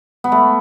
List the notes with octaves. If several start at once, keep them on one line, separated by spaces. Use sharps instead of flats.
B3
A3